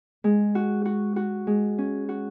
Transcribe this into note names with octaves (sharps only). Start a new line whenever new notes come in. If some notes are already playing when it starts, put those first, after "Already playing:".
G#3
F#4
F#4
F#4
G#3
C#4
F#4